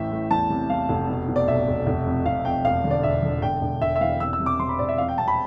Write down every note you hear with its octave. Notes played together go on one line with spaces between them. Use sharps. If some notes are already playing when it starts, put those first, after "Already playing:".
Already playing: A1 A2 E3 E5 G5
A2
E2 A5
C3
E2 F5
F1
B2
B2
D5
B1 E5
B1
F1
F2
F1 F5
F2 G5
E1 F5
D3
D5
E1 E5
D3
E1 G5
E1
E1 E5
E5
E2 F5
C3 E6
E6
C3
D6
C3 C6
B5
E1 D5
E5
F2 F5
G5
C3 A5
B5